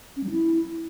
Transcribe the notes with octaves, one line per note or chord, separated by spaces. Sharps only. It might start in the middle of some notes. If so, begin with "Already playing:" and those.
C#4
G3
E4